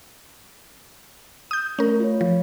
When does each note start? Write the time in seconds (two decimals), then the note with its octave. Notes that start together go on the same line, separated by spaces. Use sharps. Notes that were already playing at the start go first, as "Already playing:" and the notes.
1.51 D#6 G6
1.79 A3 C#4 A#4
2.00 F4 C#5
2.21 F3